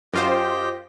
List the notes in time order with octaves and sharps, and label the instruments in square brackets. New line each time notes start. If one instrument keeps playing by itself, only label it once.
[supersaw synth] F#2 F4 C5 [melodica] G4 D#5 G5